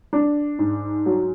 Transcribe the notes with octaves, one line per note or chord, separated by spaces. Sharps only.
D4
G#2
F#3